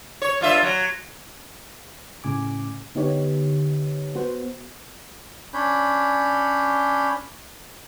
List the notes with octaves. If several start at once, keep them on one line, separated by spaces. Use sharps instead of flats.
C#5
G2 F4 E5
F#3
A2 C#3 G#5 D6
D3 B3 D#4 G4 C#5
B3 F#4 C5 F#5
C#4 D4 C#5 B5 G6